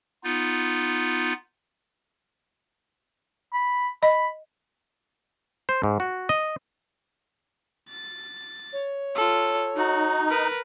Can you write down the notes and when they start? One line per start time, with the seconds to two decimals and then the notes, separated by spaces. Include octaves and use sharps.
0.24 B3 D#4 F4
3.53 B5
4.03 D#5 B5
5.69 C5
5.83 G#2
6.00 F#4
6.29 D#5
7.89 A6
8.73 C#5
9.16 F4 A4
9.76 D#4 F#4
10.29 A#4 B4